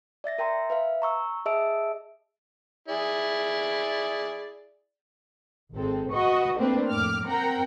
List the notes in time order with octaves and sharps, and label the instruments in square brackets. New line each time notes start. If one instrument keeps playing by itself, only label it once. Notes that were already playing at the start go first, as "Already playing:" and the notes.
[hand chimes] D5 E5 A6 A#6
A#4 E5 G5 A#5 C6
B4 E5 F5
A#5 C#6 E6
G#4 D#5 E5 A5 E6 D7
[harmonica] E4 G#4 D5
[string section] G#1 G#3 C4 A4
F#4 B4 D#5 C#6
A3 A#3 C4 D4 B4
F2 A2 D6 F6
C4 A#4 F#5 G5 A#5